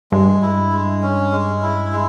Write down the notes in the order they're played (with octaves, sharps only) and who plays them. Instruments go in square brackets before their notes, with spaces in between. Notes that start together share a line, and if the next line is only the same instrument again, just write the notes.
[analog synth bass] G2 [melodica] G#3
[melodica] E4
G#3
C#4
G#3
E4
G#3